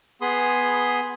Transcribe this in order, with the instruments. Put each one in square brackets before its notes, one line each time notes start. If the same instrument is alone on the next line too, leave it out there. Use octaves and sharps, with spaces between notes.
[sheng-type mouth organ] B3 G#4 B5 C6 D#6